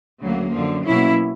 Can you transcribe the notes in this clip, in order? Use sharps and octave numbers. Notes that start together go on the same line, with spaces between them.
D2 C#3 F#3 A#3
F#2 D3 F3
B2 F#3 A#3 C#4 E4